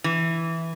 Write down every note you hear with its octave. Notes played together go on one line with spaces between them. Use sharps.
E3